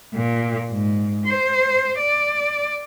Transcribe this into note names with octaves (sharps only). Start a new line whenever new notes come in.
A#2
G#2
C5
D5